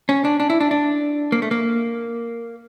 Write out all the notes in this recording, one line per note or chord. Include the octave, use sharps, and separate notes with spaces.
C#4
D4
D4
E4
D4
D4
A#3
A3
A#3